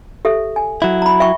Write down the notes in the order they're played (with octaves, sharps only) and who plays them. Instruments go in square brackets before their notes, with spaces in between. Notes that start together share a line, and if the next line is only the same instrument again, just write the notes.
[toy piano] G4 A4 E5
G#5
[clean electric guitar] F#3 E4
[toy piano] A#5 B5
E5 G5 C#6